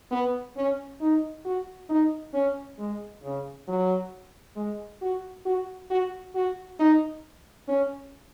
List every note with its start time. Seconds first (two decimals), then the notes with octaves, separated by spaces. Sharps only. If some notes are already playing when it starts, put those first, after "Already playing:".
0.11 B3
0.56 C#4
1.01 D#4
1.45 F#4
1.89 D#4
2.34 C#4
2.79 G#3
3.24 C#3
3.68 F#3
4.56 G#3
5.02 F#4
5.45 F#4
5.90 F#4
6.35 F#4
6.79 D#4
7.68 C#4